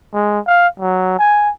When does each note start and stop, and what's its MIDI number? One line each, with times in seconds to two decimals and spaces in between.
0.14 0.40 56
0.46 0.68 77
0.80 1.16 54
1.19 1.50 80